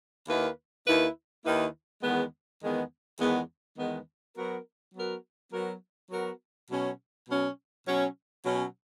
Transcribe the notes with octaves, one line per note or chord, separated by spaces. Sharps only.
D#2 D#3 A#3 E4 B4
D#2 D#3 A#3 E4 B4
D#2 D#3 A#3 E4 B4
E2 D#3 G#3 B3
E2 D#3 G#3 B3
E2 D#3 G#3 B3
E2 D#3 G#3 B3
F#3 B3 F#4 A#4
F#3 B3 F#4 A#4
F#3 B3 F#4 A#4
F#3 B3 F#4 A#4
B2 F#3 C#4
B2 F#3 C#4
B2 F#3 C#4
B2 F#3 C#4